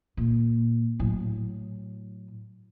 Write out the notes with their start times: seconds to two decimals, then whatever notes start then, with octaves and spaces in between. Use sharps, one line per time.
0.17 A#2
0.99 A2 F#3